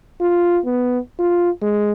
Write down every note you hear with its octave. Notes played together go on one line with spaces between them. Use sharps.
F4
B3
F4
G#3